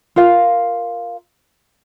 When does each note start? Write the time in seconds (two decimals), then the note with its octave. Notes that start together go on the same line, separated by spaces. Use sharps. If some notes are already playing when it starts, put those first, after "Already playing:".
0.16 F4 A#4 F5